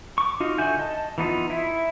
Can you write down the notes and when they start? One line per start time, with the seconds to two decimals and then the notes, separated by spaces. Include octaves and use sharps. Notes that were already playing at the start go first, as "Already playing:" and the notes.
0.18 C#6 D6
0.40 D#4 F4 F#4
0.58 D3 F#4 E5 G#5 G6
0.79 D#5 A5
1.18 E3 B3 D#4 F4
1.50 E4 E5